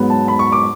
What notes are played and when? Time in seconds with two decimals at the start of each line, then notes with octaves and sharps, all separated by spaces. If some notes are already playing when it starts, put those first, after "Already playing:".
Already playing: G#2 F#3 B3
0.10 A5
0.28 B5
0.39 C#6
0.52 D6